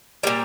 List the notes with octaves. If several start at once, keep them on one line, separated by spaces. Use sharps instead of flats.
A#2 G3 A#3